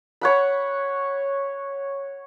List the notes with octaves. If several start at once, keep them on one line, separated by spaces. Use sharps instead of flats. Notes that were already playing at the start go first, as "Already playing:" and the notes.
C#5 F#5 B5